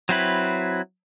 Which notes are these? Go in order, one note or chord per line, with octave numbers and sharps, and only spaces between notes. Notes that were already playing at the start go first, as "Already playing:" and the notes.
F#3 C4 E4 B4